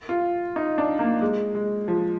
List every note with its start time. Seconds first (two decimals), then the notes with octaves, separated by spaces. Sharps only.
0.09 F4
0.56 D#4
0.78 D4
0.99 A#3
1.21 G#3
1.55 G#3
1.88 F3